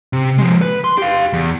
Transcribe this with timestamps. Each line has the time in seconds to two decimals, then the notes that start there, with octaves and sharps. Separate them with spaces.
0.13 C3
0.38 F3 G#3
0.61 B4
0.84 C6
0.98 G4 F5
1.33 E2